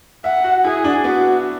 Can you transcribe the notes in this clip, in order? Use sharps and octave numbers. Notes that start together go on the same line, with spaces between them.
E5 F#5
F#4
E4 G#4
D4
B3 F#4